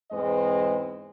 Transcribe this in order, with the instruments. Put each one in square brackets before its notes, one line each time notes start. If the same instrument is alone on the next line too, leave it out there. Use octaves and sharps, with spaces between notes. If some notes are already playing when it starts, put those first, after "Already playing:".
[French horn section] E2 G#2 G#3 C4 B4 D#5